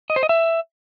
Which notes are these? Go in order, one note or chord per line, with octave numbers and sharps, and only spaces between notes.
D#5
C5
D#5
E5